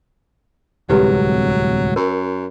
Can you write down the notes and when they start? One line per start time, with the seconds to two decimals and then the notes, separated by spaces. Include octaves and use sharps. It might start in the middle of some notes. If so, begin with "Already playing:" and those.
0.89 D1 C2 F#3 G#3 E4 G4 B4
1.96 F#2 A#4